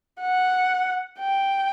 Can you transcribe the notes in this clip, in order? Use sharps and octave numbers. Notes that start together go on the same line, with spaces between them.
F#5
G5